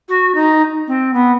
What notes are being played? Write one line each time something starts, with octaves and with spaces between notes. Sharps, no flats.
F#4
D#4
C4
B3